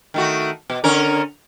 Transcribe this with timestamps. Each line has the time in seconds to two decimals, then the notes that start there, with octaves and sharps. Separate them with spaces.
0.14 D#3 A3 F#4
0.70 B2
0.84 D3 C#4 A#4